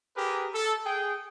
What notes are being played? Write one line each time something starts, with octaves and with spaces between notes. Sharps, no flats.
G4 G#4 A#4 B4
A4
G#4 G5